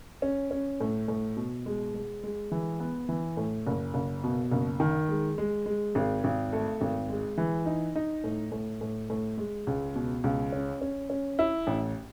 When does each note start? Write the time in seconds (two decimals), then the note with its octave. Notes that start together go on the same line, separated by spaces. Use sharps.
0.22 C#4
0.51 C#4
0.80 A2
1.08 A2
1.37 B2
1.66 G#3
1.95 G#3
2.23 G#3
2.51 E3
2.80 B3
3.09 E3
3.37 A2
3.67 F#1
3.94 F#1
4.24 B2
4.51 F#1
4.80 D#3
5.09 G#3
5.38 G#3
5.66 G#3
5.95 G#1
6.24 G#1
6.53 A3
6.81 G#1
7.10 G#3
7.38 E3
7.66 D#4
7.95 D#4
8.24 A2
8.52 A2
8.81 A2
9.10 A2
9.37 G#3
9.67 C#2
9.95 B2
10.24 C#2
10.52 C#4
10.81 C#4
11.10 C#4
11.39 E4
11.67 A1